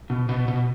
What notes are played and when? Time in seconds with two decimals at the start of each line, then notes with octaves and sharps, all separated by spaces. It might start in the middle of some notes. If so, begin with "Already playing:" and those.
0.10 B2
0.29 B2
0.48 B2